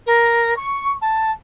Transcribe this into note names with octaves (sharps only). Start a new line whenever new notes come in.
A#4
C#6
A5